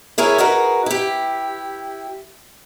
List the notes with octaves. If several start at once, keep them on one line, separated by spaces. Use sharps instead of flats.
E4 G#4 A#4 C#5
D#4 F#4 G#4 A#4 B4
E4 G4